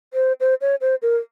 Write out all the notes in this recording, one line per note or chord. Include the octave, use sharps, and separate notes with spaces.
C5
C5
C#5
C5
A#4